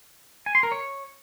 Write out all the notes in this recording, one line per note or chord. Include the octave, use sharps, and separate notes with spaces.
G#5
C6
A#4
C#5